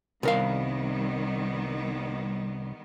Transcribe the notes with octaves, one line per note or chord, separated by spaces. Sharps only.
C2 D#3 G3 B3 A#4 F5